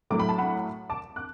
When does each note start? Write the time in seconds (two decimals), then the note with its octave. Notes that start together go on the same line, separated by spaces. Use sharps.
0.10 A2 F#3 A3 D6
0.20 B5
0.29 A5
0.38 F#5 B5
0.90 A5 D6
1.16 D6 F#6